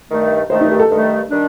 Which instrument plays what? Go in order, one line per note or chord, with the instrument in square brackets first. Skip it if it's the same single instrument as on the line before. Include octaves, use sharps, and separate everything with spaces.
[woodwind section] G2 D#3 A3
[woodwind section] G2 D#3 A3 [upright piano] C5
[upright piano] D#4
G4
A4
[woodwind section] G2 D#3 A3
D#3 G3 D4